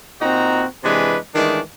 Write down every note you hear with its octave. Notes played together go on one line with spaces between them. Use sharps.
A#2 C4 D#4 F#4 A#5
C3 E3 G#3 D4 B4
D#3 E3 G#3 A3 D4